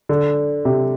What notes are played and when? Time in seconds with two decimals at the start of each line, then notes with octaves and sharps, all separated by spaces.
0.09 D3
0.65 C3